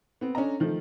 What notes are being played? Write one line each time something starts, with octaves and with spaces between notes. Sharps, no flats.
B3 C4
C#4 D4 A4 D#5 A#5
D#3 F3 A3